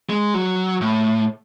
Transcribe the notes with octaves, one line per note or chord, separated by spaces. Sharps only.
G#3
F#3
A2